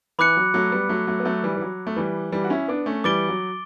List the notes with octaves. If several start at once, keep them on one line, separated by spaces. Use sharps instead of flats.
E3 B5 D6 F#6 C#7
F#3
F#3 A3
G3 B3
F#3 A3
F#3 A3
B3
F#3 A3
E3 G3
E3
F#3
A3
E3 G3
E3 G3
F#4
C#4 E4
B3 D4
A3 C#4
E3 G3 D6 A6 D7 G7
F#3